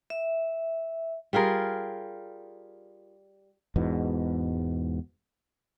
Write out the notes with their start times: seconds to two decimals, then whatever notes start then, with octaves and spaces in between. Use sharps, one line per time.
0.10 E5
1.33 G3 F4 G#4 A#4
3.76 E1 E2 G#2 B2